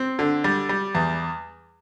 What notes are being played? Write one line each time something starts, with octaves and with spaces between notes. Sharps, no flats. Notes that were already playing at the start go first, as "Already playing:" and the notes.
Already playing: C4
D3
G3
G3
E2